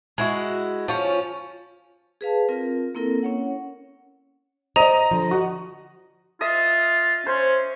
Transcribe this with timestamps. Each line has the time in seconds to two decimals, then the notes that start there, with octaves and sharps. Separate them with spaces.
0.18 G#3 E4 F#4
0.88 F3 C#4
2.21 G#4 B4 F5 A5
2.49 C4 F4 A#4
2.95 A#3 C4 E4 A4 A#4
3.23 C#4 C#5 F#5
4.76 C5 D5 D#5 A#5
5.11 D3 F3
5.31 F#4
6.41 F4 D#5 E5
7.26 C#4 C5